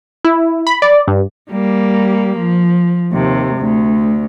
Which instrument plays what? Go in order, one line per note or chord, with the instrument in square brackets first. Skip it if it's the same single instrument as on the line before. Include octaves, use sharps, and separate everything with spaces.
[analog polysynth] E4
B5
D5
G2
[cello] G3 A#3
F3
D#2 C3
D2